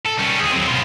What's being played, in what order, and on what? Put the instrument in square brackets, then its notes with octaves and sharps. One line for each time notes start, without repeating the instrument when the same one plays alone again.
[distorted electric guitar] A4
G3 C#4
D#2 G#4
F#3 C4
B2 F4